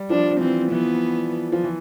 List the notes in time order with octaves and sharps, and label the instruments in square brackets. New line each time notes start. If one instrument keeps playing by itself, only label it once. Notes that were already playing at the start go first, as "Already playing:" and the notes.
Already playing: [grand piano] G3
[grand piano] F3 [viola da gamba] D4
[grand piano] E3 [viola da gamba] C4
[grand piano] E3 [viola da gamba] B3
[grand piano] F3
E3